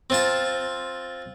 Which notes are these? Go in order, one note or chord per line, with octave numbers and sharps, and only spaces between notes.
C4 F4 A5